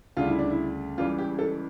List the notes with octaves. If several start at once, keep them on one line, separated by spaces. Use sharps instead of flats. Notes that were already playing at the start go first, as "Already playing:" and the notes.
D2 C#3 G3 F4
E4
D4
E4
C#2 C#3 E3 G3 F4
G4
A4